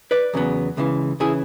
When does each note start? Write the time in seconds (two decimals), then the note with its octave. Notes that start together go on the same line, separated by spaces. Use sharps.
0.11 B4 D5
0.34 E2 C#3 F#3 B3
0.77 C#2 C#3 E3
1.20 C#3 E3 E4 G#4